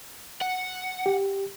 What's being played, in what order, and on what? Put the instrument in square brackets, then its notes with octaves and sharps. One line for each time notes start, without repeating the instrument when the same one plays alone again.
[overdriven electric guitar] F#5
[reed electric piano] G4